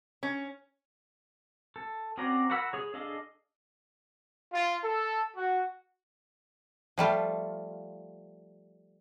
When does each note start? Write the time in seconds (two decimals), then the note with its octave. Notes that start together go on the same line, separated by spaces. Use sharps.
0.23 C#4
1.76 A4
2.18 C4 C#4 F#4 D5 A#5
2.50 F#4 A#4 F#5 B5 E6
2.73 G#4 C#5
2.94 D4 G#4 A4 D#5 F5
4.53 F4
4.84 A4
5.35 F#4
6.98 F3 G3 A3 F4